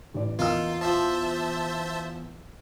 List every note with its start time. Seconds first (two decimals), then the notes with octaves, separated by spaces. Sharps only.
0.14 A1 D5
0.39 E2 A#3 D#4 F4 E6
0.81 F3 C5 E5 A5